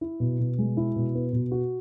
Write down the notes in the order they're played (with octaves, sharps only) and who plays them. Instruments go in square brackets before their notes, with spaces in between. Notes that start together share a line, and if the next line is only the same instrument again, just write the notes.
[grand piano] E4
B2
B2
G#3
E4
B2
B3
B2
F#4